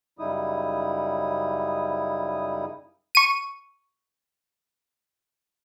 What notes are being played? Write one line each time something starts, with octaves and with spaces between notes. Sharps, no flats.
F#2 C#3 G3 D#4 E4 D#6
C#6 D#7